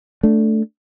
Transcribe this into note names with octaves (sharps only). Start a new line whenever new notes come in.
A3 D4